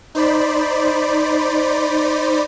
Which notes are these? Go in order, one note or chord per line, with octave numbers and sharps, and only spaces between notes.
D#4 C5 D5 B5